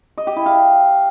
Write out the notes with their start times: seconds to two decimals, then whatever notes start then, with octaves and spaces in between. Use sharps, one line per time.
0.18 D#5
0.27 G4
0.36 E4
0.46 F5